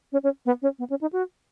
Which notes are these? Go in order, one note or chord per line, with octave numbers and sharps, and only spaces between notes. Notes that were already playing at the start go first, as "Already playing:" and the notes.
C#4
C#4
B3
C#4
B3
C#4
D#4
F#4